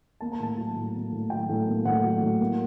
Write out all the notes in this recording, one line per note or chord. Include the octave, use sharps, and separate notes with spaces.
A#3 A5
A#5
A2 A5
F#3
A2
A#3
A2
F#3 G5
A2
A#3
A2 F#5
F#3
A2
A#3